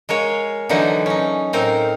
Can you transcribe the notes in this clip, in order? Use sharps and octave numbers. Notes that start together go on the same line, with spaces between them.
G#3 A#4 C#5 F5
D3 E3 F#3 D#4
C#4 D#4
A2 C4 D#4 A#4 F5